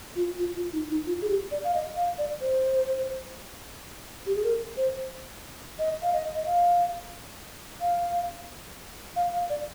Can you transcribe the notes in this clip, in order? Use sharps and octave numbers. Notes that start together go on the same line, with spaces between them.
F4
F4
F4
D#4
D#4
F4
G#4
G4
D5
F5
D#5
F5
D5
C5
G4
G#4
A#4
C5
D#5
F5
D#5
D#5
F5
F5
F5
F5
D5